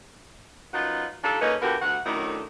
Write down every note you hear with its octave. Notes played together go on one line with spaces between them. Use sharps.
F#2 D#4 F4 B4 F#5
G3 D4 D#4 F4 A4
C#3 A#3 C#4 D#4 A4 B4
A#2 D3 B3 F#4 G4 A#4
D2 F#5
F#2 A2 D#3 A3 D4 D#4